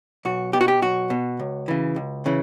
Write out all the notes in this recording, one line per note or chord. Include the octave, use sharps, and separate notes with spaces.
B1 F#4
B2 G4
F#4
G4
B1 F#4
B2
C#2
C#3 E3
C#2
C#3 E3